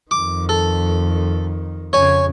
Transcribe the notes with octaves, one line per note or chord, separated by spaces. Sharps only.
F2 D#3 D6
A4
F2 C#3 C#5 G#5